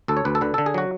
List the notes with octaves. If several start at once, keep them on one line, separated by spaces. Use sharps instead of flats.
D2 A4
C#5
D2 B4
A4
D3 B4
D3 A4
G#4
F#3 F#4